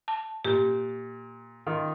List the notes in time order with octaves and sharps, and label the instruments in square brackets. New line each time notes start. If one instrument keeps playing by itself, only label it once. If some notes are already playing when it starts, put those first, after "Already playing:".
[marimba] A5
[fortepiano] A#2 [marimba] G4
[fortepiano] D#3 F4